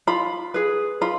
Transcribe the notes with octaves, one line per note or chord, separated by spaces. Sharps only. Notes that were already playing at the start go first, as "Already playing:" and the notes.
F4 B5
G#4 B4
F4 B5